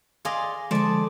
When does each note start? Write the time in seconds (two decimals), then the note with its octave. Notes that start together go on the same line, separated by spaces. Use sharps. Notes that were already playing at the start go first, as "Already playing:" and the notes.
0.25 G#4 D5 D#5 F5 C6
0.71 D3 F3 G#3 A3 C5 D5 A5